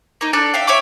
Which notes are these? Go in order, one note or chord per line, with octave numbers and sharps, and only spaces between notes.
A#3 D#4
D4 A4 D5 F#6
E5 F5 G5
C#5 E5 G5 D6